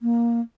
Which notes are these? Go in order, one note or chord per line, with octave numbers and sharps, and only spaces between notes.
A#3